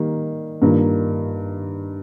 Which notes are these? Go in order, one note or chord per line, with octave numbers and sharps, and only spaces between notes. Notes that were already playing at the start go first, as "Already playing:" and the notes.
Already playing: D#3 G3 A#3
G2 D#3 A#3 F4 A#4